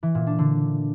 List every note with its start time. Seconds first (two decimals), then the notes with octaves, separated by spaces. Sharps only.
0.03 E3
0.15 A#2
0.27 D4
0.39 D3